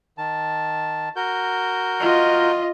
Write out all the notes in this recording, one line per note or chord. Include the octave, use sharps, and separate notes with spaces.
D#3 A5
F#4 A#4 G6
F4 D#5